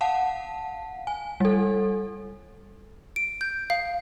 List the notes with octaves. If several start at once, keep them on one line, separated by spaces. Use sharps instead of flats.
F5 F#5 A5
G#5
G3 A4
D7
G6
F5